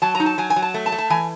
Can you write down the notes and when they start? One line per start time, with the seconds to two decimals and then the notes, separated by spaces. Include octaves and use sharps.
0.02 F#3 A5
0.15 A#5
0.20 D#4
0.26 A5
0.38 F#3 G#5
0.50 G#5
0.56 F#3
0.62 A5
0.74 A3
0.86 A5
0.92 A3
0.98 A5
1.10 E3 G#5